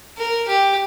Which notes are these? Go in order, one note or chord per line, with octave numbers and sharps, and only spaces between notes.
A#4
G4